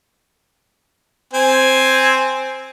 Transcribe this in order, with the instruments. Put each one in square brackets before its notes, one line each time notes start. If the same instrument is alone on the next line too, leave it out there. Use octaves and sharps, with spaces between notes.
[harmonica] C4 G#5